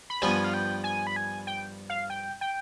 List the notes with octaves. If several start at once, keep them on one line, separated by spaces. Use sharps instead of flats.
B5
G2 F3 B3 G#5
F5
G5
G#5
B5
G#5
G5
F5
G5
G5